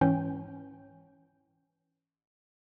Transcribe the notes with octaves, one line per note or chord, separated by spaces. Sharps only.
G#2 E3 C#4 G5